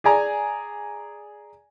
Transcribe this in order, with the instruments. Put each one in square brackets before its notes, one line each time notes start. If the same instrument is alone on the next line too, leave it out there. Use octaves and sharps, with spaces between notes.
[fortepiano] G#4 D5 G#5 A#5